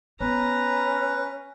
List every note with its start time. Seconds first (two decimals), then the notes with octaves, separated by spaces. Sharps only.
0.21 B3 C#4 B4 A#5